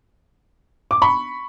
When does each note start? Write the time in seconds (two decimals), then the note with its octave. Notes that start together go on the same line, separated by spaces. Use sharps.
0.91 D6
1.02 B5 C#6